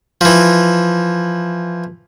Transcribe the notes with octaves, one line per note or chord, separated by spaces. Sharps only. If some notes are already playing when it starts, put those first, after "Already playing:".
E3 F3